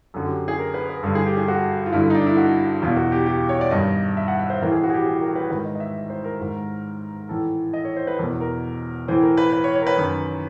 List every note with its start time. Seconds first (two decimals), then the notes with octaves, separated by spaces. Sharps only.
0.14 F#2 D3 F#4
0.26 G4
0.48 G#4
0.59 A#4
0.74 B4
0.89 B4
1.03 G2 A4
1.06 D3
1.15 G#4
1.26 G4
1.37 G#4
1.48 F#4
1.86 F4
1.92 G2 D3 E4
2.10 D#4
2.15 D4
2.26 E4
2.37 F#4
2.82 E2 F4
2.86 B2
2.97 F#4
3.12 G4
3.26 G4
3.49 C#5
3.61 D5
3.71 G2 D#3 D#5
4.17 E5
4.28 F#5
4.39 E5
4.50 C5
4.61 A2 E3 A#4
4.72 G#4
4.84 F#4
4.90 G#4
4.94 G4
5.05 G#4
5.21 A#4
5.35 B4
5.50 G#2 D#3 B4
5.65 D#5
5.75 D#5
5.80 E5
6.10 C5
6.24 A#4
6.40 G#2 D#3
7.29 A2 E3 A4
7.73 D#5
7.85 C#5
7.96 C5
8.07 B4
8.19 E2 A#4
8.22 B2
8.40 A#4
9.08 A2 E3 C5
9.23 A#4
9.37 B4
9.52 B4
9.64 C#5
9.75 C#5
9.82 A#4
9.87 B4
9.97 F#2 D#3